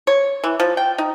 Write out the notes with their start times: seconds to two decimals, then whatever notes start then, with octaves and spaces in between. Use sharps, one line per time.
0.07 C#5
0.44 E3
0.60 F3
0.77 G5
0.98 D#4